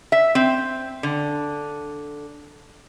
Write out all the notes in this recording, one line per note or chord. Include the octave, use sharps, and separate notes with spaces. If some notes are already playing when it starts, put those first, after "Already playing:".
E5
C4
D3